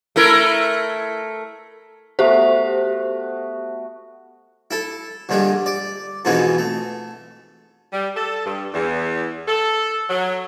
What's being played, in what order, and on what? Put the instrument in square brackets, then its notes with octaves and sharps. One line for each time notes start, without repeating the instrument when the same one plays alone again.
[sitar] A3 E4 A#4
[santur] A3 B3 F#4 [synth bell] G4 C5
[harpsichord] E4 A4
A#1 G2 D3 G3 G#3
D5
F2 G#2 B2 E3 G#3 B3
A3
[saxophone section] G3
A4
G2
E2
A4
F#3